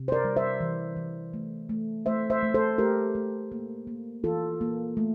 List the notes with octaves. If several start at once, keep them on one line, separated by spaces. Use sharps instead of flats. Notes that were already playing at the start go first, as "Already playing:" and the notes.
Already playing: C3
C5
A#4 D5
G3
C5 E5
E3
E3
A3
A3
A3 C5 E5
C5 E5
A3
A4 C5
A3 G4 A#4
A3
A#3
A#3
E3 F4 A4
A#3
A3